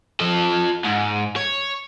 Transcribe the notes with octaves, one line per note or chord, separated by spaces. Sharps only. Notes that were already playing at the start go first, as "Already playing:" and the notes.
F3 A4
G#2
C#5